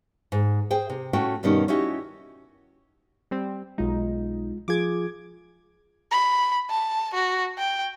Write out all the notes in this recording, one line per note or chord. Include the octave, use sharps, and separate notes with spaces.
G#2
G#4 C5 G5
C3
A2 A3 C#4 F#4 G5
G2 B2 D#3 G3 C#4 D#4
C#4 D#4 E4 F#4 G4
G3 C4
B1 G#3 D#4 F4
F3 F4 G#4 D6 G#6
B5
A5
F#4
G5